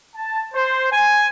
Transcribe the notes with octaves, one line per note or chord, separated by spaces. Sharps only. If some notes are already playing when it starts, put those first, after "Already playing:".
A5
C5
G#5